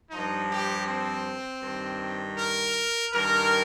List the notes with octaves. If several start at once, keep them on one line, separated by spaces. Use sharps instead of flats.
G2 F3 D#4
G4
C4
G2 D#3
A#4
G2 D#3 A#4